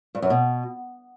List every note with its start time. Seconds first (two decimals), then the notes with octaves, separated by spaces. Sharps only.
0.15 G2
0.22 F#2
0.30 B2